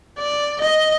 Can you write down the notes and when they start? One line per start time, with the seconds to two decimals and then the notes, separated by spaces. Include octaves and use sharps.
0.19 D5
0.61 D#5